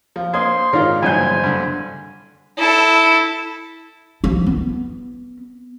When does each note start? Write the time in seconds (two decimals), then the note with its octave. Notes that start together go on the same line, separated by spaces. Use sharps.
0.16 F3
0.34 A#3 C5 C6 D#6 G#6
0.73 G#2 F4 A#4 C#5 D5
1.03 F#1 E2 G2 B2 C5 G#5 G6
1.44 G2 D3
2.57 E4 A4
4.24 F3 E4
4.46 B3